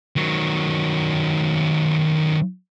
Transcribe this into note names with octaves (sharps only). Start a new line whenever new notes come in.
D#3 F#3